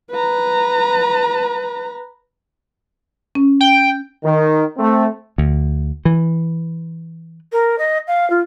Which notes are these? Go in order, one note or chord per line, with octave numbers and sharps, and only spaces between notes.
B4 A#5
C#4
G5
D#3
A3 C4
D2
E3
A#4
D#5
F5
F4